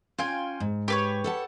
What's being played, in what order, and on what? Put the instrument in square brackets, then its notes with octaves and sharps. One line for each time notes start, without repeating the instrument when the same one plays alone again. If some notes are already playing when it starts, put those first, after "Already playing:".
[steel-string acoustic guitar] C#4 [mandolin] F4 G5 G#5
[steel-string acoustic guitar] G#2
[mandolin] G4 B4 C#5
[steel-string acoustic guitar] A4 F#5 A5